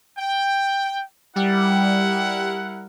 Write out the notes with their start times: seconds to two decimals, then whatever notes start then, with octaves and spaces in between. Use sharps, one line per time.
0.17 G5
1.36 G3 E4 A#4 F#5